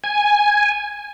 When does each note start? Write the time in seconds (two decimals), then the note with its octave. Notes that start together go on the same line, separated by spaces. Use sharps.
0.04 G#5